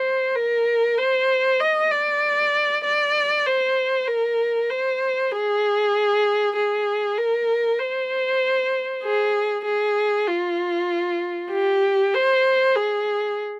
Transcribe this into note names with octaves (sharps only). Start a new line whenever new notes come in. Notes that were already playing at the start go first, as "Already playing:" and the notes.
Already playing: C5
A#4
C5
D#5
D5
D5
C5
A#4
C5
G#4
G#4
A#4
C5
G#4
G#4
F4
G4
C5
G#4